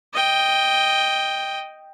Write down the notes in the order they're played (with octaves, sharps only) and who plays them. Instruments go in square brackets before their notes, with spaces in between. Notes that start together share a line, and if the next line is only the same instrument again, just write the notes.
[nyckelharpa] D#5 G5